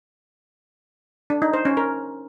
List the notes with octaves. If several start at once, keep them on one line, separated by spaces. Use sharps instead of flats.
D4
D#4
C5
C#4
A#4